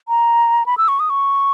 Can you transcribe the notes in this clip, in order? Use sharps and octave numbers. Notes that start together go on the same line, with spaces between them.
A#5
B5
E6
C#6
D#6
C#6